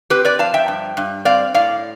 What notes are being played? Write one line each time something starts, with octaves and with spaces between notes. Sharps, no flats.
C4 G4 B4
B4 D5
F3 F5 A5
E5 G5
G2
G2
C4 D5 F5
A2 D5 F5